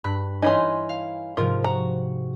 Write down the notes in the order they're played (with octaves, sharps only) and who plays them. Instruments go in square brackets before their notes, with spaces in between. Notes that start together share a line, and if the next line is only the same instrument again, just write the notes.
[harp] G2 B5 F#6
[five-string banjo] E3 C#4 D#4 [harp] G#5 B5 C6
[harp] F5
[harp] G#2 C3 F3 [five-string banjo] F4 A#4
[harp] F#4 [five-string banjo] A#5